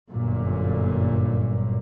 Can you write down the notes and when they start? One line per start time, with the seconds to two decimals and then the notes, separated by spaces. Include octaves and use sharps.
0.10 G1 F#2 A#2 D3